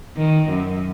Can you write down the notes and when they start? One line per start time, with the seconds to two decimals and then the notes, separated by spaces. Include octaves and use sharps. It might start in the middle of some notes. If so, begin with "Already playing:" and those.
0.17 D#3
0.50 F#2